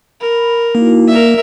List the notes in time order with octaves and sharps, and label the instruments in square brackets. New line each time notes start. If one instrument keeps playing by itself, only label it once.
[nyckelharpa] A#4 [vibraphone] B5
[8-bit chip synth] A#3 [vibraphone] D#4 E4 F#4
[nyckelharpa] A#4 E5 [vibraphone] D5